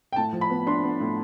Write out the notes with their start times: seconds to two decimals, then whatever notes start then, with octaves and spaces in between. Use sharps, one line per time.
0.13 G5
0.16 A2 A5
0.33 F3
0.41 B5
0.50 B3
0.67 D4 C6
0.84 B3
1.00 A2